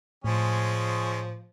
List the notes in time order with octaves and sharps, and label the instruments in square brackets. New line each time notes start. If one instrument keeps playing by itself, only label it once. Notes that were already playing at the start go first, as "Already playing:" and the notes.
[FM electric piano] A2 [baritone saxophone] F3 [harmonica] G#3 C#4 G#4